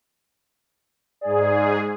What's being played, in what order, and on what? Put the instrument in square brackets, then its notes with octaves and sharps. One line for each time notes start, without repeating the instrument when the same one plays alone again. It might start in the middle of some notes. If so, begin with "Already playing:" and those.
[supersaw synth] G#2 G#4 [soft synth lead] D5